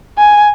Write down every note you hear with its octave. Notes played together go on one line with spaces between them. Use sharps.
G#5